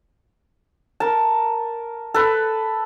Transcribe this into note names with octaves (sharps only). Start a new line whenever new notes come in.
A#4 A5
A4 B4